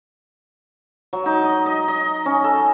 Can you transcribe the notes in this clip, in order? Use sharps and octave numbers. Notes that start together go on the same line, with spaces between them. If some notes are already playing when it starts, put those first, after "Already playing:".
F#3
D#4
D#5
D#5
D#5
C#4
A4